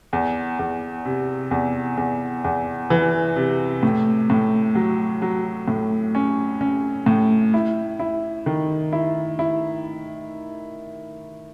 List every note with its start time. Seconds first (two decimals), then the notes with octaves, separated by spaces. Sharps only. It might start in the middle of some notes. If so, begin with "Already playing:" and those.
0.13 E2
0.59 E2
1.05 C3
1.51 E2
1.97 E2
2.44 E2
2.90 E3
3.36 C3
3.83 A2
4.30 A2
4.75 F#3
5.22 F#3
5.68 A2
6.15 C#4
6.61 C#4
7.06 A2
7.54 E4
7.99 E4
8.46 D#3
8.93 E4
9.39 E4